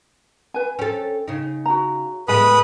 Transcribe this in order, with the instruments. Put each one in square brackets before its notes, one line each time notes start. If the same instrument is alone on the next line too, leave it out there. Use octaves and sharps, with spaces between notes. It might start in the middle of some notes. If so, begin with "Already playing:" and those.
[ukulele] B4 G#5
[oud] C#4 A4 [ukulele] G5
[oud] C#3 D#4
[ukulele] F#4 A#5
[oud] A2 G#3 B3 [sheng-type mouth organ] B4 B5 D#6 [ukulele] G#5